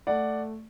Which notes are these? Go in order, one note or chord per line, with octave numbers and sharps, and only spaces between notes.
A3 D5 F#5